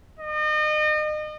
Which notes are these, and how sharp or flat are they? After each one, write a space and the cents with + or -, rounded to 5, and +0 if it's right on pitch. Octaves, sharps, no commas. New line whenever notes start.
D#5 -35